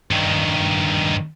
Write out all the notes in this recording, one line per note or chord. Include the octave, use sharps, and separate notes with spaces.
G2 D#3